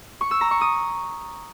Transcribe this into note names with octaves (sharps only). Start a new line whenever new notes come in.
C#6
E6
A#5
C#6
D#6